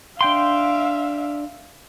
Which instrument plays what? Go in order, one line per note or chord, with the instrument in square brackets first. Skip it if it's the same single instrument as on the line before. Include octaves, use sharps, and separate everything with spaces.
[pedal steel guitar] D4 G5 C6 [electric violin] E5 F5